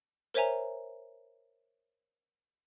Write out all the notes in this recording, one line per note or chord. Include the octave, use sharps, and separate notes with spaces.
A#4 C5 C#5 E5 G#5 A#5